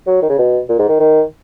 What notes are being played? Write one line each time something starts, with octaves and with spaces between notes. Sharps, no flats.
F#3
D#3
C#3
B2
A#2
G#2
D#3
D#3